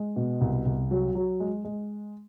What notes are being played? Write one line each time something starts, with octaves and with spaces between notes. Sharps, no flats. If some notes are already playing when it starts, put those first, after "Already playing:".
Already playing: G#3
B2
C2
C2
F#3
F#3
G#3
G#3